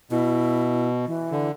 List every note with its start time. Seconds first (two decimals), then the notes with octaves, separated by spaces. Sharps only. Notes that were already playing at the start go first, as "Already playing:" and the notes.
0.11 B2 E4
1.07 E3
1.31 D3